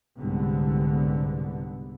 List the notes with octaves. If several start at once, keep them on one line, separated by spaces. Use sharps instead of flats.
C2 G#2 D3 B3